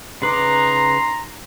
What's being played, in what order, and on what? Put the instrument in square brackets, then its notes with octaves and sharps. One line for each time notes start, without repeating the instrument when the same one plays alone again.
[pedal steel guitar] C#3 B4 D6 [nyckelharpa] D#4 [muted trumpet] A#5 [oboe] C6